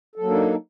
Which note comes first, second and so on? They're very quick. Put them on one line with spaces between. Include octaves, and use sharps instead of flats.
A4 F#3 A#3 D4 D#4